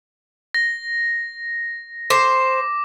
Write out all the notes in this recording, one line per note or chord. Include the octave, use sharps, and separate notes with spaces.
A#6
C5 D6